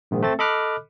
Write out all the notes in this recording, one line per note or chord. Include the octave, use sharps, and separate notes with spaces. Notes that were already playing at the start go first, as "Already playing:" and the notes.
A#1 G#2 D#3
A3 C4 A6
A4 D#5 B5 D6 F6 F#6